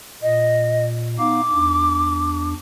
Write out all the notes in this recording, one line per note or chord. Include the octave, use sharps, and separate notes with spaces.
A#2 D#5
B3 D#4 F5 D6
E2 D4